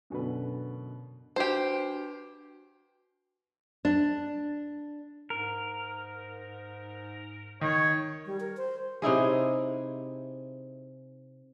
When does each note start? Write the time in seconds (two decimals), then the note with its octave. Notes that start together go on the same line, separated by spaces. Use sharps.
0.10 F#2 B2 D3 B4
1.36 D4 F#4 G4 B4 C5
3.85 D4
5.30 G#2 A#4
7.61 D#3 C#5
8.26 G3
8.40 A#4
8.57 C5
9.02 C3 D#4 E4 G#4